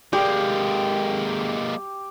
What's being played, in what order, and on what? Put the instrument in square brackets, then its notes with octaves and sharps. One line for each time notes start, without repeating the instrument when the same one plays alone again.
[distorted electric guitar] G#3 A#3 [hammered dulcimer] G4